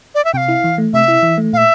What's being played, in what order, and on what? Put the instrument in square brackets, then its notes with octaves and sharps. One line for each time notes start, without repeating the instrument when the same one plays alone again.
[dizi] D5
E5
[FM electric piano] C3 [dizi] F5 G5
[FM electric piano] E4
E3
A3
[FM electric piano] C3 [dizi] E5
[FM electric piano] E4
E3
A3
[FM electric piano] A#2 [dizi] F5
[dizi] E5